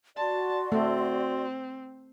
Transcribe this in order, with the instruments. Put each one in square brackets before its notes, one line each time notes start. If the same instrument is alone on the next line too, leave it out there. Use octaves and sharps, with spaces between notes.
[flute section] F#4 D5 C6 [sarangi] A5
[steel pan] A3 [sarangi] C4